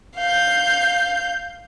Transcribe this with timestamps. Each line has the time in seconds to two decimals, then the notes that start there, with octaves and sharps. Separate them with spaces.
0.16 F5 G6